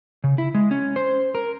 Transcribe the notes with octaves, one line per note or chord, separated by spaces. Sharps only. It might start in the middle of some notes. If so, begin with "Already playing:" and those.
C#3
E4
G#3
C#4
C5
A#4